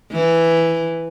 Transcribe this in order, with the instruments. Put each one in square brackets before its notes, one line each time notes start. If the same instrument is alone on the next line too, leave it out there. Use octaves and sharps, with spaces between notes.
[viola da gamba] E3